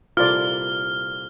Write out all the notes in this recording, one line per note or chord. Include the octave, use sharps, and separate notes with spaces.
C2 A#2 F4 A4 D5 F6